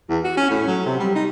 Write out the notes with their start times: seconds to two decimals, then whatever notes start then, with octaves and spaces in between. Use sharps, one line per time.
0.10 E2
0.24 F#4
0.37 C#4
0.51 A2
0.67 F#3
0.86 C3
1.00 G3
1.16 D#4